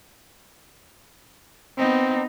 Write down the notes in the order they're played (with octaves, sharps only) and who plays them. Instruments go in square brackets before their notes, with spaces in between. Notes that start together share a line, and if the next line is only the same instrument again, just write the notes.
[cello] B3 D#4 [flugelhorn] C4